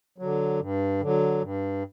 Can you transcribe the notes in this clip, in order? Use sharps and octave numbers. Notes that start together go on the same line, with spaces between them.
D3 F#3
G2
D3 F#3
G2